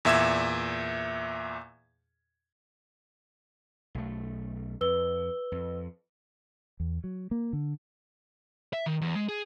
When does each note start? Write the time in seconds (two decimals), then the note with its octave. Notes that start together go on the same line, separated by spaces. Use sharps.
0.05 E2 A#2 E5 E6 G#6 E7
3.95 B1 A3
4.81 F2 B4 E6 G7
5.52 F2
6.80 E2
7.04 F#3
7.31 A#3
7.53 D3
8.73 E5
8.86 D#3
9.02 E2
9.15 G#3
9.29 G#4